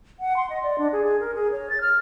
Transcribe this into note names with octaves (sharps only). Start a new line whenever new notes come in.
F#5
C6
D#5
D5
D4
G#4
G#4
A#4
G#4
C#5
A6
F6